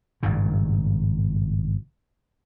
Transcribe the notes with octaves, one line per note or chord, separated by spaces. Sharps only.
G#1 G2 A#2 C#3